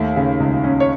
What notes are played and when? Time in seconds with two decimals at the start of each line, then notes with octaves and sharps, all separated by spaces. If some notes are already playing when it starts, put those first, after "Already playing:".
Already playing: D#2 A3
0.16 C#3
0.40 C#2
0.64 C#4
0.80 C#5